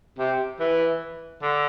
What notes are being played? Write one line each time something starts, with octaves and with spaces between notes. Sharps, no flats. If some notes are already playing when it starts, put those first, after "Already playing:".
C3
E3
D3